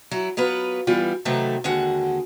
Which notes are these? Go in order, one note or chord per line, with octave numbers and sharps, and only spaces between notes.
F#3 E4
F#3 B3 F4 B4
E3 G3 B3 F4
C3 D#3 F#3 A3 A4 B4
D#2 D3 G#3 F#4 F#5